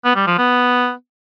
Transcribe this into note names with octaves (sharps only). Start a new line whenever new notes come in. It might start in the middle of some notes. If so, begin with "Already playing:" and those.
B3
G3
F3
B3